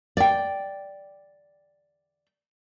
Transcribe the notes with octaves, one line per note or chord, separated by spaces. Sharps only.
D5 G5